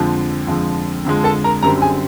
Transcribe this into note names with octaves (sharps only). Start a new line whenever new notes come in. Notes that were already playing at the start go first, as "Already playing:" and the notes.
Already playing: F2 D3 F3 G#3
F2 D3 F3 G#3
F2 D3 F3 G#3
A4 A5
A#4 A#5
F#2 D3 G3 C4 A#4 A#5
G#4 G#5